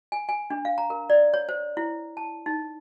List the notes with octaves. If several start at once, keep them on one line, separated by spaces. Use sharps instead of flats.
G#5
G#5
D4
F5
A#5
A#4
D5
C#5
C5
E4
A5
D#4